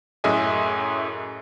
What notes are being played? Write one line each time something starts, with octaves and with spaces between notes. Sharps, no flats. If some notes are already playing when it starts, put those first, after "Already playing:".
F#2 A2 G#4 D#5 E5 G#5